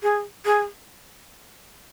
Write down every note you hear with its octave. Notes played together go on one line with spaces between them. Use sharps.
G#4
G#4